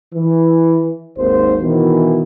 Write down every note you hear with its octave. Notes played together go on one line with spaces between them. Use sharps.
E3
G#1 D#2 C5
B2 D#3 E3